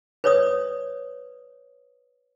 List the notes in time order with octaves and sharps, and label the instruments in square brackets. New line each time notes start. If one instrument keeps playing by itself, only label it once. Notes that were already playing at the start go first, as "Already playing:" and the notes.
[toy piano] B4 C#5 D5 D#6